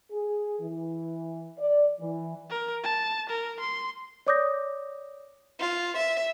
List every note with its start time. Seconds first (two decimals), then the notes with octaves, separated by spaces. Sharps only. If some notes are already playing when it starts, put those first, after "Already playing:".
0.11 G#4
0.60 E3
1.58 D5
2.00 E3
2.50 A#4
2.83 A5
3.29 A#4
3.60 C6
4.27 C#5 D5 D6 D#6 G6 A#6
5.59 F4
5.97 E5